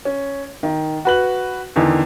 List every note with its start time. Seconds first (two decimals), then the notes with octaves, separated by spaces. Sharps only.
0.05 C#4
0.63 D#3
1.05 F#4 B4 F#7
1.76 E2 D3 D#3